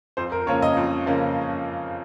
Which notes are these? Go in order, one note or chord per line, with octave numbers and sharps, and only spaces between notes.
F2 C5
A#4
C#3 F3 A#3 C#4 C#5
D#5
F2
C#3 F3 A#3 C#4